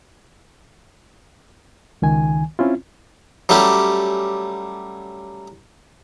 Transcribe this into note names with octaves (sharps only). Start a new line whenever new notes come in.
C#2 D#3 G#5
C4 C#4 E4 F4
F#3 G3 A3 C#4 G4